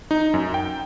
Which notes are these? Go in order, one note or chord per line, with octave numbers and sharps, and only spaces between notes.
D#4
F#2
G5